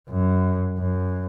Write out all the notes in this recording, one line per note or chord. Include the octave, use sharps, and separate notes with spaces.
F#2
F#2